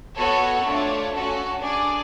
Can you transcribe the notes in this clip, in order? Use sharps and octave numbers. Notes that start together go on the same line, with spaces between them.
B3 F#4 A4 C#5
A3 D4 F4
C#4 F#4 A4
D4 G#4 D5